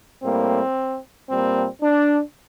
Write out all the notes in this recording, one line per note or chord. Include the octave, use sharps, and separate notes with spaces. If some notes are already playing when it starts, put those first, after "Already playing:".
A2 G3 A#3 C4
A#2 G3 A#3 C4
D4